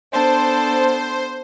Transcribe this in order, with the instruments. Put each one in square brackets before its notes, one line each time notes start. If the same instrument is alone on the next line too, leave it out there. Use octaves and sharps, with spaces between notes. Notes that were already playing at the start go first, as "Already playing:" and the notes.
[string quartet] B3 D4 A4 [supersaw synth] C5